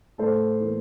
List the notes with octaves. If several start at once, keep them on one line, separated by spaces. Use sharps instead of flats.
A2 A4 C5
E3 A#3